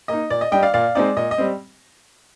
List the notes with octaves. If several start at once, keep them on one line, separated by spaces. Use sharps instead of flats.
A#3 D#4 D#5
A#2 D5
D#5
G3 D4 D#5 G5
D5 F5
A#2 D5 F5
G#3 C4 D#4 D5
A#2 D#5
D#5
G3 C4